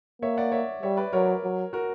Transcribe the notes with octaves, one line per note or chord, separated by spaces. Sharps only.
A#3 C#5 E5
D5 F#5
C#5 E5
G3 C#5 E5
B4 D5
F#3 A#4 C#5
F#3
F#4 A#4